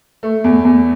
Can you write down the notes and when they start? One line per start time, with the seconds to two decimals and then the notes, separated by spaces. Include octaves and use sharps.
0.23 A3
0.44 E2
0.65 E2